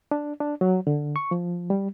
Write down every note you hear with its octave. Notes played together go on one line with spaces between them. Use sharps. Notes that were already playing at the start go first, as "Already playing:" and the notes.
D4
D4
F#3
D3
C#6
F3
G3